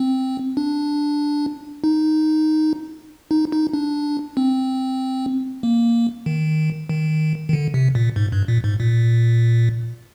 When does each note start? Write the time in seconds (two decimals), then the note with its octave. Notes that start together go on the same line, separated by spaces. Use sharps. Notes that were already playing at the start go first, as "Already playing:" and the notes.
Already playing: C4
0.57 D4
1.84 D#4
3.31 D#4
3.52 D#4
3.73 D4
4.37 C4
5.63 A#3
6.26 D#3
6.89 D#3
7.49 D#3
7.53 D3
7.74 C3
7.95 A#2
8.16 G#2
8.32 G2
8.48 A#2
8.64 G#2
8.80 A#2